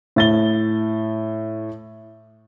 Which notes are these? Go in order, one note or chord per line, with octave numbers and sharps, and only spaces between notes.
A2 A6 G7